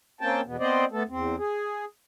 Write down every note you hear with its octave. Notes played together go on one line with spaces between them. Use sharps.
A#3 C4 C#4 G5 A5
E2 B2 B3
B3 C4 C5 D5 D#5
A3 B3 A4
E2 C4
G#4